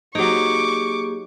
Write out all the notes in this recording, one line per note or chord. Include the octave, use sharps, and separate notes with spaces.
F#3 A#3 D#4 G4 G#4 C#6 D6